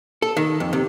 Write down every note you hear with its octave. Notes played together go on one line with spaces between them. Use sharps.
A4
D#3
F2
C3